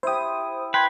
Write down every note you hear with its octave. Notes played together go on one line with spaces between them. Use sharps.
E4 G4 C5 D#6
B4 G5 C6 G#6